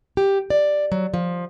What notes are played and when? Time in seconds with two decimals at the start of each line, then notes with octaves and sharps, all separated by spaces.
0.17 G4
0.50 D5
0.92 F#3
1.14 F3